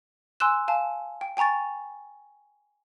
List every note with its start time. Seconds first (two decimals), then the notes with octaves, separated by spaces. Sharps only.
0.40 G#5 C6 E6 F#6 E7
0.68 F5 G#5 A5
1.21 G5
1.37 G5 G#5 A#5 C#6 A6